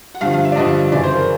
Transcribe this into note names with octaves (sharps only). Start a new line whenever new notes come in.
F#5
G2 D3 F3 F5
F5
E5
D5
G2 D3 F3 D#5
F#2 C#3 E3 D5
C5
A#4